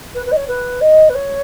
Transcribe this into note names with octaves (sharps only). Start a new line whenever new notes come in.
B4
B4
D#5
C#5
B4
D#5
B4
C#5